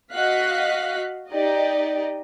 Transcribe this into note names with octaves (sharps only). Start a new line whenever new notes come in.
F#4 D#5 F5 F#6 B6
D#4 G4 D5 D#5